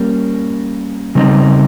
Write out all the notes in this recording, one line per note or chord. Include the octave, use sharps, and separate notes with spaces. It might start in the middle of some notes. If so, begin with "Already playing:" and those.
Already playing: G3 A#3 C#4
C#3 G3 C4 D#4